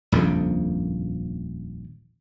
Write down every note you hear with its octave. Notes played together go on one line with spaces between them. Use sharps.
D#1 A#1 F2 C#3